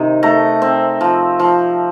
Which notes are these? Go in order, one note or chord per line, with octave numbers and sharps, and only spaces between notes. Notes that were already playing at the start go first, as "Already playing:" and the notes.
Already playing: C3 D#3 D#4
A3 A#5
C4
F3
F3